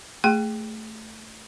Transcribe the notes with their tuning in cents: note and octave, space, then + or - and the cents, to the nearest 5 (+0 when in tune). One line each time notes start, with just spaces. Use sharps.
A3 +0 G#4 +0 G5 +0